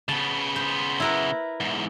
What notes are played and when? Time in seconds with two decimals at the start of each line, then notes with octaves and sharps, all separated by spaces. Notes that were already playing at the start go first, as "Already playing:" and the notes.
0.09 C#3 B3 A5
0.56 C5
1.00 E4 A#4 B4
1.60 E2 G#2